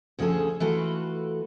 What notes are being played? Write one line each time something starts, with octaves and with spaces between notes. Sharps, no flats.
D2 C#3 F3 F#4 G#4 A4
E3 A3 F4 F#4 A4 B4